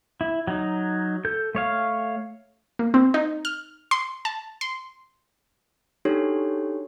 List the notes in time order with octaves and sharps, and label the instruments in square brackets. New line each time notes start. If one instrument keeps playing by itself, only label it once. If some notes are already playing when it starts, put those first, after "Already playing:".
[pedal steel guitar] E4
F#3 D#4
A4 G6
A3 C#5 F5
[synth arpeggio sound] A#3
C4
D#4
F6
C6
A5
C6
[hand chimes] D4 D#4 F#4 G4 A4 C#5